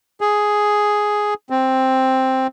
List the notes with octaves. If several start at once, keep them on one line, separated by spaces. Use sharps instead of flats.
G#4
C4